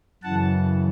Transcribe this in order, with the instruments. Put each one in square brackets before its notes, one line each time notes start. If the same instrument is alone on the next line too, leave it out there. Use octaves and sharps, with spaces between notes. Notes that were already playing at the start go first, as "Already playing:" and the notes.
[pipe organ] F#2 C#3 E3 F#5 A5